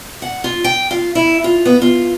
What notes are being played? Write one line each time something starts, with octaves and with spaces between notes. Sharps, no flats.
F#5
F4
G5
F4
E4
F4
B3
F4